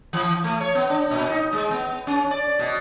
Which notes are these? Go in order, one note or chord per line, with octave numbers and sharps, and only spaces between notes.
E3
A3
C#5
B3
D4
A#2
D#4
G#3
B3
C#4
D5
B2